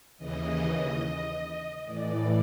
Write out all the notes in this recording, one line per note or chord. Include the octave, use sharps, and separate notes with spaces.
D#2 C#3 E3 D#5
A2 E3 D5